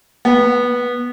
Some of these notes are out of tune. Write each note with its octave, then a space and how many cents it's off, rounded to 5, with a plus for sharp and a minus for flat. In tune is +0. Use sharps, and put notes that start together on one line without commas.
B3 -15